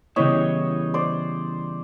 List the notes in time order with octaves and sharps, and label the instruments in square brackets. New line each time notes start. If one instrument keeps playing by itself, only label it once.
[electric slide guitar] C#3 E3 G3 B3 E4 [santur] C#5 D#5
[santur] C5 D5